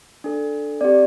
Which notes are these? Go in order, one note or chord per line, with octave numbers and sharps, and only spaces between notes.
D4 A4
C4 G4 D5